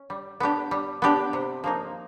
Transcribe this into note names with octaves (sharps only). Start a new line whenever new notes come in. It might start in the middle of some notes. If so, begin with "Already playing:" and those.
Already playing: C#4
G3
B3 D4 G4
G3
B3 D4 G4
C3
F3 A#3 D#4